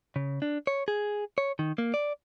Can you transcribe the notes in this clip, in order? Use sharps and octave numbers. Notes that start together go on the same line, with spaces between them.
C#3
D4
C#5
G#4
C#5
D#3
A#3
D5